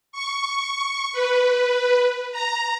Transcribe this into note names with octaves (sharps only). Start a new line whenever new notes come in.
C#6
B4
A#5